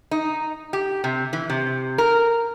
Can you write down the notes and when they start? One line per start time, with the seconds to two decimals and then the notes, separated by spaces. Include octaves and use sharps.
0.11 D#4
0.73 G4
1.04 C3
1.33 E3
1.50 C3
1.98 A#4